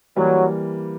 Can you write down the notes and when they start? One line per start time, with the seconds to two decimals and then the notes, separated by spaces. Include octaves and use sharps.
0.16 E3 F#3 G3 A#3